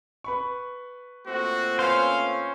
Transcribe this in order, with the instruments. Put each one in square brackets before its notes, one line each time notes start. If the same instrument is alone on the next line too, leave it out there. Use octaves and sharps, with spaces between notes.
[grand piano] B4 B5 C#6
[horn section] A#2 A3 C4 [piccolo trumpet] F#4
[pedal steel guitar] C#4 C5 [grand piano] B4 [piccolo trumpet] F5